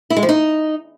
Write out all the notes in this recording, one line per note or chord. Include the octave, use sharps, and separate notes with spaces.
E4
G#3
F3
D#4